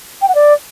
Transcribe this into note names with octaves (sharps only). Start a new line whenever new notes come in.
G5
F#5
D5